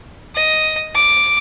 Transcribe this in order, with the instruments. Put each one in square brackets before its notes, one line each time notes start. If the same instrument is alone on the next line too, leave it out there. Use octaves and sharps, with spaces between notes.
[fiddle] D#5
D6